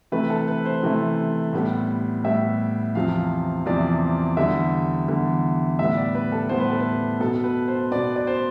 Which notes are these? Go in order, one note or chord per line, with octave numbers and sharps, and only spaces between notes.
C3 E3 A3 B4
A4
B4
C5
C3 E3 A3
A2 G3 B3
A2 G3 B3 E5
E2 C3 F3 F5
E2 C3 F3 D5
E2 D3 G3 E5
E2 D3 G3
A2 G3 B3 E5
D5
B4
A4
A2 G3 B3 C5
B4
A4
B4
B2 B3 A4
B4
C5
B2 B3 D5
D5
C5